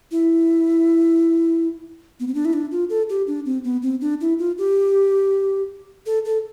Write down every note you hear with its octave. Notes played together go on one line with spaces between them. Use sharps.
E4
B3
C4
D4
E4
D4
F4
A4
G4
D4
C4
B3
C4
D4
E4
F4
G4
A4
A4